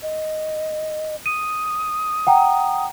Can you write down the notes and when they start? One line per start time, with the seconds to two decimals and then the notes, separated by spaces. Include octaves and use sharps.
0.03 D#5
1.26 D#6 D#7
2.27 F#5 G5 A#5